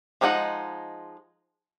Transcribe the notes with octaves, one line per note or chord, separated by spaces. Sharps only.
F3 G#3 D4 D#4 F#5